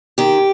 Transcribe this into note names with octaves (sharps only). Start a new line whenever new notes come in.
D#3 G4